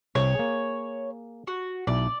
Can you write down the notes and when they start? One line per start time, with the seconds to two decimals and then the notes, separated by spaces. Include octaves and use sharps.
0.15 C2 C3 C5 C#5
0.35 A#3 G#4
1.47 F#4
1.87 B1 E4 D5